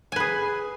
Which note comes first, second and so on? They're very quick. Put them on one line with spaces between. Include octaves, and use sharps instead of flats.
G#5 B4 G#4